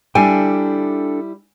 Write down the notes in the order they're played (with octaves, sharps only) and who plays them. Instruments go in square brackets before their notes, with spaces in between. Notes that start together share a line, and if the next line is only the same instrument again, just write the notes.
[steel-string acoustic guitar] G3 E4 [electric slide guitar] D4 A4 G5 [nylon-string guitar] G#5